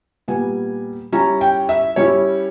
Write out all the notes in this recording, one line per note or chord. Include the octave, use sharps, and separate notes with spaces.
A#2 G3 B3 G#5
G3 C#4 E4 A#5
G5
E5
G3 C#4 E4 C#5